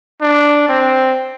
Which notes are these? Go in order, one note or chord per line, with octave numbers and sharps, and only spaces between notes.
D4
C4